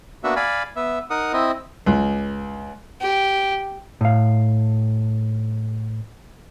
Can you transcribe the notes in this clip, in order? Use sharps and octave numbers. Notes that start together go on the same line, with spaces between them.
A#3 B3 D4 F#4 E5
D5 F5 G#5 B5
B3 E5
D#4 A#4 F#5 D#6
C4 E4 D#5
C#2
G4
A2 F5